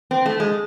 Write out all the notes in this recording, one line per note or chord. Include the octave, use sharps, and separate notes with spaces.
C4
A3
G#3